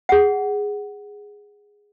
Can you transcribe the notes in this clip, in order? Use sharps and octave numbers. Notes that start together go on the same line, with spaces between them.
G#4 F#5